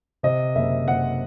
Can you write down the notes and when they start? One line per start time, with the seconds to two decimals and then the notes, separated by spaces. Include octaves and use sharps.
0.23 C3 D#5
0.55 F#1 E5
0.88 F#1 F#5